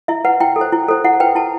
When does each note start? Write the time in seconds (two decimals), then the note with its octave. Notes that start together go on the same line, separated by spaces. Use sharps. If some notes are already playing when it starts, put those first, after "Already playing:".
0.08 E4 E5
0.25 B4 F#5
0.40 E4 G5
0.56 A4
0.61 C5
0.73 E4
0.89 A4 C5
1.04 E4 F#5
1.20 B4 G5
1.35 E4 A5